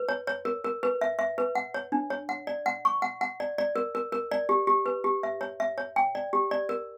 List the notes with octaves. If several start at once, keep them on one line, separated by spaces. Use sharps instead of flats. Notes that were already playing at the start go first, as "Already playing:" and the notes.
Already playing: B4
C#5
C#5
A#4
A#4
B4
E5
E5
B4
F#5
C#5
D4
C#5
F#5
D5
F#5
C#6
F#5
F#5
D5
D5
A#4
A#4
A#4
D5
G4
G4
B4
G4
E5
C#5
E5
C#5
G5
D5
G4
D5
A#4